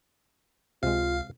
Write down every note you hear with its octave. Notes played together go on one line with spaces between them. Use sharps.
C#2 C3 G#3 F4 F5